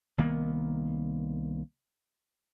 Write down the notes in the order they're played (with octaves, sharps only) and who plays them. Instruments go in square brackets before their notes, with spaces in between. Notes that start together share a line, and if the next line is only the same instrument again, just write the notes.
[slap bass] C2 D#3 A#3 B3